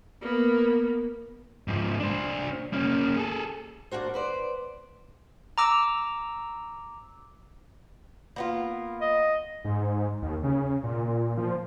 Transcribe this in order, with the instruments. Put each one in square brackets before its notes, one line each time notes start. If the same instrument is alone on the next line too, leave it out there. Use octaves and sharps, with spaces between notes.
[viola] A#3 B3
[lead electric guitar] G#2 F3
D4 C5
A#3 C#4
G#4 A4
[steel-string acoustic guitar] A#3 D4 F#4 C5
B4 C5 D5
[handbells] A#5 D6 E6
[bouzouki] A#3 B3 F4
[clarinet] D#5
[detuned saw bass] G#2
D#2
C#3
A#2
F3